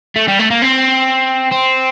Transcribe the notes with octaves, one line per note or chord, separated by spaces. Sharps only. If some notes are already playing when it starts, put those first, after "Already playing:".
A3
G3
A3
A#3
C4
C4